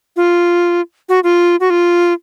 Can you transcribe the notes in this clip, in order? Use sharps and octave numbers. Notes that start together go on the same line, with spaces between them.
F4
F#4
F4
F#4
F4